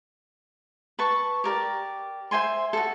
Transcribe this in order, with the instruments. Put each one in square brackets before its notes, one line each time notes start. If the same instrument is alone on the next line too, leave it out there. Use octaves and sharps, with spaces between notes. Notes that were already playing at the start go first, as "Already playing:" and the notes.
[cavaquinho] B4 A5 C#6
G4 A#4 D5
C5 E5 G#5 C6
F#4 A4